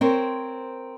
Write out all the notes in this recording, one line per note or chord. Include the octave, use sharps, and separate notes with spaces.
C4 A#4 C5 C#5